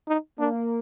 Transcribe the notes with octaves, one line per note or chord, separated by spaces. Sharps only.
D#4
A#3 D4